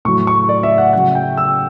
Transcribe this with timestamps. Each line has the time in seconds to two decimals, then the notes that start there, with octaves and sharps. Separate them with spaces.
0.05 A2 F#3 C#6
0.27 C#6
0.49 D5
0.63 E5
0.78 F#5
0.93 C#3 F#3 F#5
1.15 G5
1.37 E6